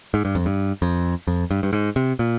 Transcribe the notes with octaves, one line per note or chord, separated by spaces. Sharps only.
G#2
G2
F2
G2
F2
F2
G2
G2
G#2
C3
A#2